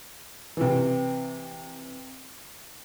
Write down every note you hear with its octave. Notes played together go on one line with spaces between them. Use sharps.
C3 E3